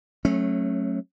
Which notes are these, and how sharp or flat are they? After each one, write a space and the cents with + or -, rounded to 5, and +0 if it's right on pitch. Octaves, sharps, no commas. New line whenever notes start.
F#3 +0 A3 +0 C#4 -30